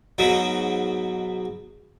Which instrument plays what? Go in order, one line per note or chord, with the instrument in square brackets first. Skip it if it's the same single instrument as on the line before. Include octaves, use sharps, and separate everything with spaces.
[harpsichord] G#2 B2 F#3